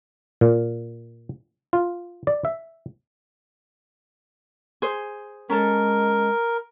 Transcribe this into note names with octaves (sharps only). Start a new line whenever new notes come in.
A#2
F4
D5
E5
G#4 C5
G#3 C#4 A4 A#4